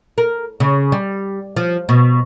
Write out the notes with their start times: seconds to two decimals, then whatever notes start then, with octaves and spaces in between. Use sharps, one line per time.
0.18 A#4
0.60 C#3
0.92 G3
1.56 F3
1.89 B2